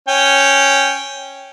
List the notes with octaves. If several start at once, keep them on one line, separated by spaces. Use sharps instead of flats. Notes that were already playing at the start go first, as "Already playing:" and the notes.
C#4 G5